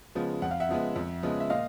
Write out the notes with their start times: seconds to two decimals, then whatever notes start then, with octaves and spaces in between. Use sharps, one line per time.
0.15 C#3 F3 G#3 B3
0.42 F2 F#5
0.51 F5
0.60 E5 F#5
0.69 C#3 F3 G#3 B3
0.96 F2
1.23 C#3 F3 G#3 B3
1.40 E5
1.50 A#2 D#5 F5